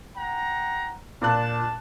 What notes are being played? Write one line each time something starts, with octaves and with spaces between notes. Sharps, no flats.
F#5 G5 A#5
A#2 D4 A5 F#6